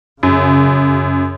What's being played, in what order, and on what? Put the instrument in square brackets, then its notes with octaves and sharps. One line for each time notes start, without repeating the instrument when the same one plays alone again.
[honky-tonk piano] F#2 [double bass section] C#3